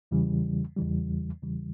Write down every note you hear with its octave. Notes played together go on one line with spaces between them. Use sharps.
E2 C#3 E3 G3
E2 C#3 E3 G3
E2 C#3 E3 G3